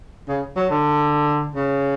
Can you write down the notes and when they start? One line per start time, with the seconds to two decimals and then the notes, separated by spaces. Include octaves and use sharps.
0.28 C#3
0.57 F#3
0.70 D3
1.55 C#3